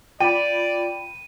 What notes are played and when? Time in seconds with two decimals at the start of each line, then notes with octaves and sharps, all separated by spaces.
0.20 F4 D5 G5 B5 D#7